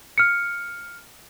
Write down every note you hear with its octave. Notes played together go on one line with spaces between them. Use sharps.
F6 C#7